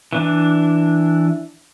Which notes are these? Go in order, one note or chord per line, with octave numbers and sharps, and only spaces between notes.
E3 D4